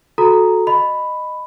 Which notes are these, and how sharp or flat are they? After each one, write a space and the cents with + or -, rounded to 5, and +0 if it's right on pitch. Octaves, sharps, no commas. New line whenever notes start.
F#4 -20 A4 -15 A#5 +0
D#5 -15 B5 +5